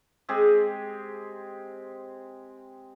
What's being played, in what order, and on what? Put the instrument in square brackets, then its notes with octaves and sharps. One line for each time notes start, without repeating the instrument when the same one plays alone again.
[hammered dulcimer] G#3 C4 G4 G#4